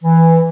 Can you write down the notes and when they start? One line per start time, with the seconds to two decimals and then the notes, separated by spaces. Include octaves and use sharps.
0.04 E3